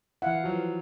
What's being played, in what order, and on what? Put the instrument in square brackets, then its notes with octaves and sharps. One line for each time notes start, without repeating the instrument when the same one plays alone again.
[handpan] E3 F5 F#5 [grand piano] E4
[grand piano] F3 F#3